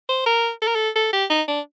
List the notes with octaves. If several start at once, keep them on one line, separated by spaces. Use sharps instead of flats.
C5
A#4
A4
A#4
A4
A4
G4
D#4
D4